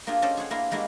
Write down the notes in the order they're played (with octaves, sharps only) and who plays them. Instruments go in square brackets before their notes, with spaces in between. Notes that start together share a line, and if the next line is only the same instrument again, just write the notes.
[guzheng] A#3 D4 F4 G4 G#4
C#4 A4 C5 D5 D#5
G#4 C5 C#5 F#5
A#3 D4 E4 A#4 F5 C6
G3 G#3 A#3 E4 F#4 G4